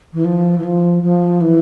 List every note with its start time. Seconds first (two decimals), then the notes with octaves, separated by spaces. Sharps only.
0.13 E3
0.24 F3
0.57 E3
0.63 F3
1.03 F3
1.40 E3